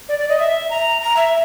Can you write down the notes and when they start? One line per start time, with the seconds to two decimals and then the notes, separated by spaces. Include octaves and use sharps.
0.09 D5
0.19 D5
0.29 D#5
0.39 E5
0.70 A#5
1.01 A#5
1.16 E5